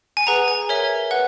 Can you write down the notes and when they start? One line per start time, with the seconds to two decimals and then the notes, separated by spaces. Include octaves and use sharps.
0.17 G#5
0.27 G#4 B4 F#5 A#5
0.48 G#5
0.69 A#4 C#5 E5
1.11 B4 F#5